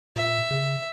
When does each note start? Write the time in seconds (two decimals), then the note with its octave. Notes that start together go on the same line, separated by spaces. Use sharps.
0.16 A#2 E5
0.51 C#3